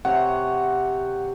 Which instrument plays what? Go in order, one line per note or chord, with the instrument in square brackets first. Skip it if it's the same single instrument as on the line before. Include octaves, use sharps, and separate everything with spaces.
[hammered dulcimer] C3 C#5 [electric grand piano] F#5